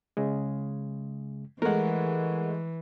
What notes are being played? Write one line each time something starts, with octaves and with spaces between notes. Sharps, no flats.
C#3 G#3
E3 G#3 A3 A#4 F#5